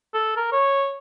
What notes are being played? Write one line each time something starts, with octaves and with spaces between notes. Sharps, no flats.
A4
A#4
C#5